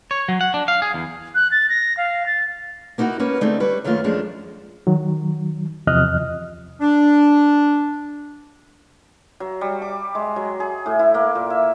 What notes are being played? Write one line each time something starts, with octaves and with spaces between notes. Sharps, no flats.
C#5
F#3
F#5
D4
F5
G#4
E2
F#6
A6
A#6
F5
A6
A#3 B3 D#4 E4 F#4
A#3 C#4 D#4 B4
D3 G#3 A3 C4 D#4
G3 B4 C#5
F#2 D#3 A3 A#3 F4
F#2 F3 G#3 A3 D4
D#3 F#3
E2 C3 F3 D#5 F6 F#6
D4
F#3
G3
D6
G#3
F#3
G#4
A2
E4
A#3
A#2
E5